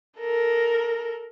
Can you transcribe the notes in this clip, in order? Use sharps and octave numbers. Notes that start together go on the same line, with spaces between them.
A4 A#4